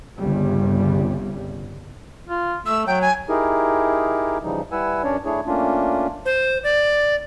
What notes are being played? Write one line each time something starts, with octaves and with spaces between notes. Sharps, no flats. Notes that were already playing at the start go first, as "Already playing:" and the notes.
G1 C2 C#3 G3
F4
A3 E6
F#3 G5
G#5
D#4 E4 G4 G#4 A#4
C#3 E3 F3 G3 D#4
G3 E4 B4 F#5 G#5 E6
F#2 C#4 D4 C#5 D5
A3 D4 E4 G#4 C#5
A3 A#3 C#4 D4 F4
C5
D5